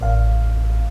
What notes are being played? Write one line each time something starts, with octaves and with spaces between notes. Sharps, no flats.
A1 F5